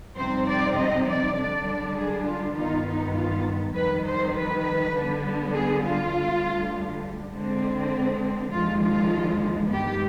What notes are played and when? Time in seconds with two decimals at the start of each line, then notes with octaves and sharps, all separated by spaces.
0.17 F2 C3 G3 C4 D#4 C5
0.47 D5
0.77 D#5
1.07 D5
1.36 D3 G3 D4 D5
1.96 G#4
2.26 F4
2.56 G2 D#3 B3 D#4 F4
2.86 D#4
3.15 F4
3.75 F2 D#3 G3 B4
4.05 C5
4.34 B4
4.94 D3 G3 B3
5.54 G#4
5.83 F4
6.13 D2 D3 G3
7.33 D3 G#3 C4
8.51 D#2 D3 F3 G#3 F4
8.82 F4
9.71 G2 D#3 G#3 B3 G4